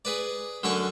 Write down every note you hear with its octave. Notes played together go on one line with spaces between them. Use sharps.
G#4 B4 D5
F#2 D3 C#4 D5 C#6